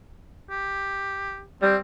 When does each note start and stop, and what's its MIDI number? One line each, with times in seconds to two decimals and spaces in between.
0.50 1.44 67
1.62 1.76 55
1.62 1.78 60